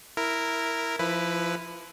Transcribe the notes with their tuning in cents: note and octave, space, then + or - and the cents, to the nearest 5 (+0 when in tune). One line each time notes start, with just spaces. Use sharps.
E4 +0 A#4 -5
F3 -20 E4 +0 B4 +10